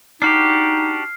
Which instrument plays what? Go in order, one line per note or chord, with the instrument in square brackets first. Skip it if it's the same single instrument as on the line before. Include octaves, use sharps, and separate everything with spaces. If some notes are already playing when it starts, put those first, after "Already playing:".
[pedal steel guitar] D4 F#4 G4 [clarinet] D#4 [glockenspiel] F6 C7